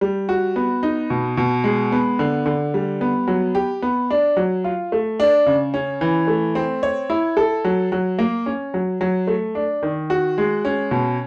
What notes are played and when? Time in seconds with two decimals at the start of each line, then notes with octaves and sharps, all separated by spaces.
0.01 G3
0.29 F#4
0.56 B3
0.83 D#4
1.10 B2
1.37 B2
1.64 G#3
1.92 B3
2.19 D3
2.46 D3
2.74 G3
3.01 B3
3.28 F#3
3.55 G4
3.82 B3
4.10 D4
4.37 F#3
4.64 F4
4.92 A3
5.20 D4
5.46 C#3
5.74 C#4
6.01 E3
6.28 A3
6.55 C4
6.83 C#5
7.10 E4
7.37 A4
7.65 F#3
7.92 F#3
8.19 A#3
8.46 C#4
8.74 F#3
9.01 F#3
9.27 A3
9.55 D4
9.83 D#3
10.10 F#4
10.38 G#3
10.65 C#4
10.91 B2